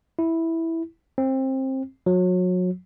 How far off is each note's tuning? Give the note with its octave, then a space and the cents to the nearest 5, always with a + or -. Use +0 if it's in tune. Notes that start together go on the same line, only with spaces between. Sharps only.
E4 -5
C4 +20
F#3 -30